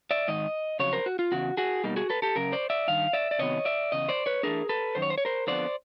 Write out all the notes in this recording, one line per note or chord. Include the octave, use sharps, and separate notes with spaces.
D5 E5
G#2 D#3 D#5
F2 C#3 F#3 C#5
A#4 C5
F#4
F4
E2 C#3 F#4
F#4 G#4
B2 G3 A#3 D#4
F#4 G#4
A4 B4
G4 A4
F#2 C#3 A#4
C5 D5
D5 E5
G2 D#3 F5
D5 E5
D5
C3 D#3 F#3 B3 C#5 D#5
D5 E5
E2 C#3 D#5
C5 D5
B4 C#5
E3 A3 D4 G#4 A#4
A4 B4
F#2 D#3 C5
C#5
C5
C#5
A#4 C5
F2 D3 F3 B3 C5 D5